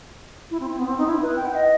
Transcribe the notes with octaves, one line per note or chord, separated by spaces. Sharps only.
E4
C4
C4
B3
C4
D#4
E4
B4
G5
F#5
D#5